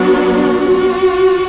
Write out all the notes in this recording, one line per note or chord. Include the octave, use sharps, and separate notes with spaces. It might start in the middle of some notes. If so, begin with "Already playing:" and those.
Already playing: F#3 B3 D4 F#4
F#4